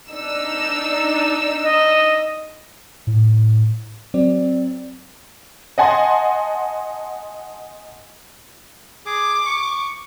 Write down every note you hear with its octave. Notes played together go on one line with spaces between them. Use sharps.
D4 D#4 E6
D#5
A2
F#3 C4 D5
D#5 F#5 G#5 A5 C6
G#4 D6
C#6